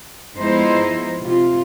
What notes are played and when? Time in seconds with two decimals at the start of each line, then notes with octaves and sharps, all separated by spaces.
0.39 F3 G#3 B3 D#4 E4 C5
1.21 C3 F4